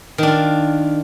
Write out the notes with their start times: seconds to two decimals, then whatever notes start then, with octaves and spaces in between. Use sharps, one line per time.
0.18 D#3
0.23 D4
0.27 F4